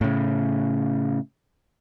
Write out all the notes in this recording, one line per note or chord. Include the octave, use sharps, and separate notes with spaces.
A2 C#3